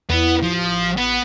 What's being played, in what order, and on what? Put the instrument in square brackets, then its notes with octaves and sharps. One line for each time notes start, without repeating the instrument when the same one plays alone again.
[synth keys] E2 E4 [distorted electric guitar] B3
[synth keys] A1 D#6 [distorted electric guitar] F3
[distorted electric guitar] B3